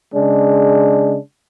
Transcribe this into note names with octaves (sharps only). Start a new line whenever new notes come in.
C#3 G#3 D4